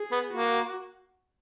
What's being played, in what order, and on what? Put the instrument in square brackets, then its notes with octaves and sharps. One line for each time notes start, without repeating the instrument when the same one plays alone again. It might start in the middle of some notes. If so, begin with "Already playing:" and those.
Already playing: [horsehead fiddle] G#4
[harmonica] B3
[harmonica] A#3 [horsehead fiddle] F#4